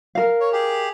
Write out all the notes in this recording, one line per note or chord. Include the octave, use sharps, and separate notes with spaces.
A#4 F5
C#5
G4 G#4